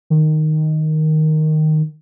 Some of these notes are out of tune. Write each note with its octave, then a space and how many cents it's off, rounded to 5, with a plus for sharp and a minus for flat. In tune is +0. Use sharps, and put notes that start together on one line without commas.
D#3 -5